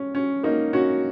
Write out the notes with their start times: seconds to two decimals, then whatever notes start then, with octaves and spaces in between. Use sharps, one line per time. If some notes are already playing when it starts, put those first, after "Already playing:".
Already playing: C#4
0.15 C#4
0.44 A#3 D#4
0.73 C#4 F#4